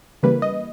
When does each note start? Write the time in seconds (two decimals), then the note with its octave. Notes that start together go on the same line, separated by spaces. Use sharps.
0.23 C#3 E3 G3 A#3 B4
0.42 D#5